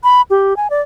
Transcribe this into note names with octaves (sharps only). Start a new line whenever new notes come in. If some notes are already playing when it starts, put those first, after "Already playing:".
B5
G4
G#5
D5